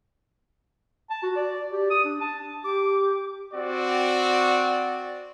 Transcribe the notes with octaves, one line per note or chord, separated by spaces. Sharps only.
A5
F#4
D5
G4
D#6
D4
A5
G4 D6
C4 F#4 D5